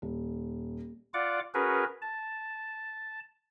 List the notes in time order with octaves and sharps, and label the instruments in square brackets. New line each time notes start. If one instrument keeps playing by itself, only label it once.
[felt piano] D#1
[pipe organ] F4 D5 F#5 D6
C#4 F#4 G#4 A#4 B4
A5